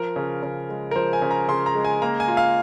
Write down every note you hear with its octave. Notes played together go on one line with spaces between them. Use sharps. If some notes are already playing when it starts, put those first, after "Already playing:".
Already playing: F3 A#4
C#3
C#3
G#3
A#4
F3 C5
G#5
C#3
A#5
C#3 C6
A#5
G#3
G#5
A#3 A#5
G#5
F4
F5